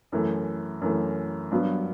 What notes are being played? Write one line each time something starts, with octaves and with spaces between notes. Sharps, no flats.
F#2 E3 A3
F#2 E3 A3
G2 F#3 B3